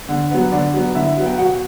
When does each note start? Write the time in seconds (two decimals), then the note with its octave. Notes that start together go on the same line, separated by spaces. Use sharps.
0.09 D3
0.31 F#3 B3
0.52 D3 D5
0.74 F#3 B3
0.95 D3 E4 E5
1.17 F#3 B3
1.26 G5
1.38 B2 F#4 F#5